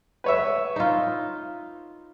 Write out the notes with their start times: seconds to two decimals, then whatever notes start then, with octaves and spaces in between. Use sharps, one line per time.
0.24 B4 C#5 E5
0.76 D#4 F4